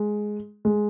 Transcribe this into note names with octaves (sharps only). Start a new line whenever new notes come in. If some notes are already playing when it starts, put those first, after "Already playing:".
Already playing: G#3
G#3